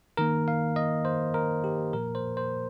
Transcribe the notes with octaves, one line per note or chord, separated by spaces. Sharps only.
D#3 A#3 A#4
F5
D#5
C5
A#4
G4
A#2 F3 A#3 A#4
C5
C5